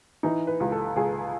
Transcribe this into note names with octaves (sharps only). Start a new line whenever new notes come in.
E3 D#4
B4
C#2
A4
C#2 G#4